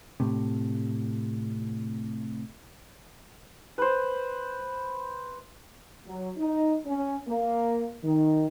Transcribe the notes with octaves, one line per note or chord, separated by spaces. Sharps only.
A2 C3
B4 C5
F#3
D#4
C#4
A#3
D#3